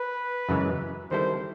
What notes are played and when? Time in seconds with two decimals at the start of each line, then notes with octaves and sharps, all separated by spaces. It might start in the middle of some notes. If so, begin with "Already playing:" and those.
Already playing: B4
0.49 F#2 C#3 E3 G#3
1.11 D#3 G3 C4 E4 A4 C5